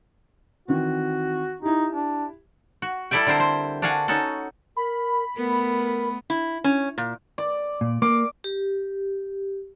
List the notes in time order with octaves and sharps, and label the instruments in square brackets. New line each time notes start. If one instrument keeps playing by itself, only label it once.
[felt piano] D#3 E3 C4 [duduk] F#4
[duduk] D#4 [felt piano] E4 G4
[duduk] D4
[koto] F#4
G3 E4 A4 D5 E5 G5
D3 C4 A#4 C5
C5
D4 F#4 F5 F#5 G#5
C#4 D#4 F#4 A4
[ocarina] A#4 [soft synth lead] B5
[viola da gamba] A3 B3 [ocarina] A#4
[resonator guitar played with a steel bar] E4
C#4
A#2
[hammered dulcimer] D5
[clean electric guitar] A#2
[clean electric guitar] A#3 [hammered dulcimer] D6
[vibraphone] G4